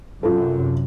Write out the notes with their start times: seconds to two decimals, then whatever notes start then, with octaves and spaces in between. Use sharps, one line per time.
0.23 F#2 C3 F4 A4